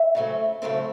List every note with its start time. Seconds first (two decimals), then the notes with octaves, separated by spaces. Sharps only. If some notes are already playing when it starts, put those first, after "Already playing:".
Already playing: E5
0.15 C#3 F#3 A3 C4
0.62 C#3 F#3 A3 C4 E5